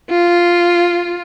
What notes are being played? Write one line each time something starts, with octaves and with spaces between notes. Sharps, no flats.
F4